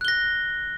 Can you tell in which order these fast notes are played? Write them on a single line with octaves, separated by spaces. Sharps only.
F#6 G7 A#6